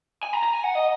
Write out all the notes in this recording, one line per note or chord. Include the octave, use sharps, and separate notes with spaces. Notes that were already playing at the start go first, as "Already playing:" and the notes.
G#5
A#5
A#5
G#5
F#5
D#5